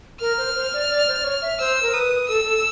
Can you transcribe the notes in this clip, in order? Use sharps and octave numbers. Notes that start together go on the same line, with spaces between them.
A#4 F6
C5
C5
D5
D5
C5
D5
C#5
E5
C5 E6
A#4
B4 D#6
A4 E6
A4